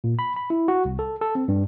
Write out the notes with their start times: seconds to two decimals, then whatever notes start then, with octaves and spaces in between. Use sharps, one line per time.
0.04 A#2
0.19 B5
0.36 B5
0.50 E4
0.68 F#4
0.85 C2
0.99 A4
1.21 A4
1.35 C4
1.48 G2